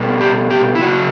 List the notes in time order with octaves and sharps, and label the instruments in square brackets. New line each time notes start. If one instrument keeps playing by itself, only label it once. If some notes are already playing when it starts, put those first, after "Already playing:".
Already playing: [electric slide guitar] B2 G3
G4
G4
E4
C#3 F#3 F#4